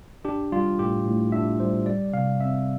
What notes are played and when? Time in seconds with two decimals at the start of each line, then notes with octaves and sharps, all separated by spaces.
0.25 D4 G4
0.52 G3 F4
0.79 A2 G4
1.06 A2
1.32 D4 E5
1.60 G3 C5
1.86 G3 D5
2.13 C3 F5
2.41 C4 E5